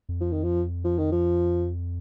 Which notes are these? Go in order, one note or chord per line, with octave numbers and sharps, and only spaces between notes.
F2
F3
D#3
F3
F3
D#3
F3